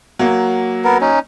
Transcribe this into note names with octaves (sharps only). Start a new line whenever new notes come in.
F#3 A#3
B3 A#4
C#4 D#4